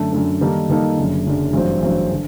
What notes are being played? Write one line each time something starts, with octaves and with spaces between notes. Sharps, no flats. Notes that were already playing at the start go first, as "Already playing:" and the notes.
Already playing: F#2 D3 A3
F#2 D3 A3
D#3 G3 A#3 D#4 A4
D#3 G3 A#3 D#4 A4
F#1 F#2 D3
F#1 F#2 D3
A1 G2 F#3 C4
A1 G2 F#3 C4
D3